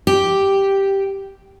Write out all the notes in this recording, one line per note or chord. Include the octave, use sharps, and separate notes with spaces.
G4